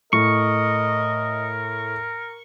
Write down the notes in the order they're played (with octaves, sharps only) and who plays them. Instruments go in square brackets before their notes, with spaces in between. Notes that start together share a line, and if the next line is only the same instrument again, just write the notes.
[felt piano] A2 [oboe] A#4 [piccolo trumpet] D#5 [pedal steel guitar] C#6